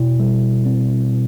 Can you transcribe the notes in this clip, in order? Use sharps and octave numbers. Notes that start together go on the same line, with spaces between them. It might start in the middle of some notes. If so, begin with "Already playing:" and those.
Already playing: B2 E4
G3
C4
B2